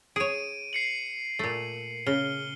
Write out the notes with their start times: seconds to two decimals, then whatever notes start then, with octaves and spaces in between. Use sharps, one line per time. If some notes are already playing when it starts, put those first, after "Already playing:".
0.16 G#4 C#5 D7 D#7
0.73 C7 C#7 F#7
1.39 A#2 A3
2.07 C#3 F6 G7